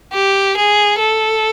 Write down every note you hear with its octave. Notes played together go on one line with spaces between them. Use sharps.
G4
G#4
A4